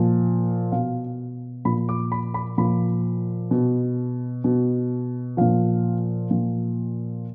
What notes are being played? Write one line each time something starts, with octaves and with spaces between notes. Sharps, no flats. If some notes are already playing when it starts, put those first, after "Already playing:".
Already playing: A#2 F3
B2 F5
A#2 F3 B5
D6
B5
B5
A#2 F3 B5
B2
B2
A#2 F3 F5
A#2 F3